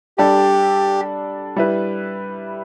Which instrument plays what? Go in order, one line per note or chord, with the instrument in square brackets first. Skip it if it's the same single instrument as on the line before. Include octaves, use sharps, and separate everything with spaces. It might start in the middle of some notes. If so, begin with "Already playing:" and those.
[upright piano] G3 D4 A4 D5 [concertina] G4
[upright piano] G3 E4 B4